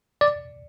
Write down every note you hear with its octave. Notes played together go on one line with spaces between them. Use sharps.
D5